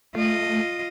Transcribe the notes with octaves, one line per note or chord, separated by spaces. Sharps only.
A3 F4 D#5